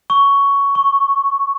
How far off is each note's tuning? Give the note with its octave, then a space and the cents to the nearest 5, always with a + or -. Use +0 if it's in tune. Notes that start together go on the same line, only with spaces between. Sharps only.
C#6 +10
C#6 -10